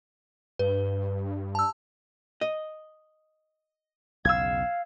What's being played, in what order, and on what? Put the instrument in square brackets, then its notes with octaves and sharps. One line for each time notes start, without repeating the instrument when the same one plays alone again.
[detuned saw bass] G2 [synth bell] B4
[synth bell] A5 E6
[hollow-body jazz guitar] D#5
[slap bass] B1 E2 C#3 [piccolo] F5 [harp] E6 G#6